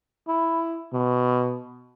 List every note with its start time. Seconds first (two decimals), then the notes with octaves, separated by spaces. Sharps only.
0.28 E4
0.93 B2